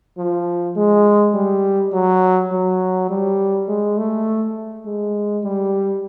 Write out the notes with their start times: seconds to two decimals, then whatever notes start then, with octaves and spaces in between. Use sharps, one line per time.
0.18 F3
0.76 G#3
1.35 G3
1.93 F#3
2.52 F#3
3.10 G3
3.68 G#3
3.97 A3
4.86 G#3
5.44 G3